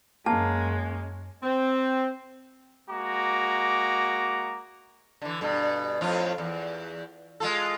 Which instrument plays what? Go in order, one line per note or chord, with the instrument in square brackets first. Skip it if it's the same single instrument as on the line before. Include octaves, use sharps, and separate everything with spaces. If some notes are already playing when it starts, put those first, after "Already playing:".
[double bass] F#2 C#4 [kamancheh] G#3 [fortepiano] A#3 [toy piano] A5
[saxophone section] C4
[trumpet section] G#3 A#3 F#4 A#5 D6
[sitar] D3 E3
G2 B2
F2 A2 F4
E2
G#3 F4 A4